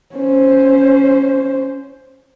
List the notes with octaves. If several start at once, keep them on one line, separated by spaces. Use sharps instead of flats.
C#4 C5